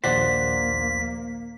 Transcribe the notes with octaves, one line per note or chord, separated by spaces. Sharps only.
A#1 D#2 A#3 C5 D5 F#5 C6 B6